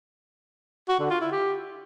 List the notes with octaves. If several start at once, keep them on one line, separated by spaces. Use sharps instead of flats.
F#4
D3
F4
E4
G4